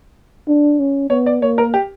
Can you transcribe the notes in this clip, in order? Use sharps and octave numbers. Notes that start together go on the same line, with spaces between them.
D4
C#4
B3 C#5
D5
A#3 C#5
A#4
G4